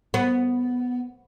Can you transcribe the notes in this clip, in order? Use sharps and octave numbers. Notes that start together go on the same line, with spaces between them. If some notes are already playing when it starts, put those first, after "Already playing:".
B3